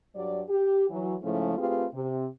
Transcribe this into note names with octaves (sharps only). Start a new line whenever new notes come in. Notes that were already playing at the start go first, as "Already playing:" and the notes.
G2 F#3 G3 D5
G4
E3 F#3
G#2 C#3 F3 A3 C#4 E4
A3 C4 F4 G4 G#4 B4
C3